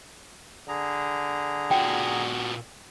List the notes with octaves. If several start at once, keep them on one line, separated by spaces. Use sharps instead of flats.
D3 G#4 A#5
A#2 F#4 G5